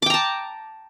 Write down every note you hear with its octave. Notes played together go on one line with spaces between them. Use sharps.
G5 A5 A#5 D6